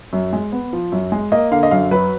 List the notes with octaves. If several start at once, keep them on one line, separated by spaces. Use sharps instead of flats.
F#2
G#3
B3
F3
F#2
G#3
A#3 D#5
D3 F5
D#5
F#2 F5
F#3 B4